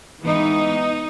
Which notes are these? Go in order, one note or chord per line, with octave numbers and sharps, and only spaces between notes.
E3 G#3 B3 D#4